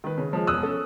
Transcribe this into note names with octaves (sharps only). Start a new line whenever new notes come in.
D#3 B4
C#3
F3 G#3
E1 D#6 E6 F#6
C#4 A4